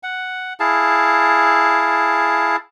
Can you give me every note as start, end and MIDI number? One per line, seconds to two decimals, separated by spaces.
0.03 0.53 78
0.60 2.56 64
0.60 2.56 68
0.60 2.56 77
0.60 2.56 81